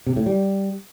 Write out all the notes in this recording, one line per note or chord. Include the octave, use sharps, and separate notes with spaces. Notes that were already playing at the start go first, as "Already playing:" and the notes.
C3
A2
G3